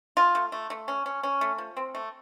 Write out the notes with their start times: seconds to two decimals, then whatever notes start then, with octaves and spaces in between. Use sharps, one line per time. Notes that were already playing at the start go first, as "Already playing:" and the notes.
0.17 F4
0.35 A3
0.52 A3
0.70 A3
0.88 C#4
1.06 C#4
1.23 C#4
1.41 A3
1.58 F3
1.77 C4
1.95 A3